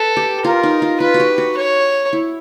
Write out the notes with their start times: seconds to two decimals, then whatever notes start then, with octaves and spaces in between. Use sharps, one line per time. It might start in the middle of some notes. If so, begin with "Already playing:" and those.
Already playing: A4 B4
0.17 G4
0.44 F4 A#4
0.63 D#4
0.82 F4
1.00 F4 B4
1.14 F#4
1.20 G4
1.38 F#4
1.57 C#5
2.13 E4